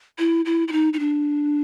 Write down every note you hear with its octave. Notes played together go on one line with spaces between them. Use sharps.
E4
E4
E4
D#4
D#4
D4